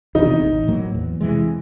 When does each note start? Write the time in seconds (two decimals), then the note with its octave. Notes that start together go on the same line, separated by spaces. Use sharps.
0.15 E2 C3 D#3 D#4
0.41 A1
0.68 A2 F#3 A#3
0.95 E2
1.21 C3 E3 G#3